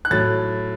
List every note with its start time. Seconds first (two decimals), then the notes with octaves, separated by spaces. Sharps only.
0.05 F#6
0.11 A2 F#3 A6